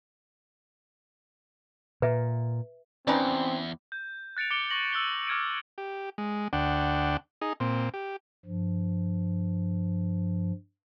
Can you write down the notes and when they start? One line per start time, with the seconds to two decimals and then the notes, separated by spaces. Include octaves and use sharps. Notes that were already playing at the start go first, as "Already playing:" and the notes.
2.02 A#2 B4 E5
3.07 E2 C4 C#4 D#4 B4 D5
3.92 G6
4.37 F#6 A6 C#7 D7 F7
4.51 D6 C#7 D7 G7
4.70 C#6 A#6 F#7
4.92 E6 F#6 C#7 D7 G7
5.27 D6 F6 G#6 C#7 D7
5.78 G4
6.18 G#3
6.53 D2 D4 F#5 G5
7.42 D#4 G#4
7.60 A#2 C4
7.94 G4
8.45 G2 F3